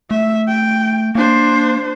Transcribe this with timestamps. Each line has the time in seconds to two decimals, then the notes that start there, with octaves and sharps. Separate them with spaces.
0.11 A3 E5
0.49 G5
1.15 A#3 D4 C5